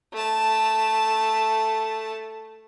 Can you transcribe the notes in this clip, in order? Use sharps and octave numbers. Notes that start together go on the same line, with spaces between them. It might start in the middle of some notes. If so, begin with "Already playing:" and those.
A3 A5